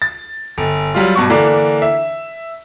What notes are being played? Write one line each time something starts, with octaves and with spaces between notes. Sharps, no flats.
A6
G1
F#3 G3 F4
G2 B2 C#6
D3 E3 A#3 D4
E5